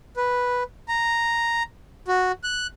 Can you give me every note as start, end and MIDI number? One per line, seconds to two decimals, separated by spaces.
0.17 0.63 71
0.88 1.63 82
2.08 2.32 66
2.44 2.67 90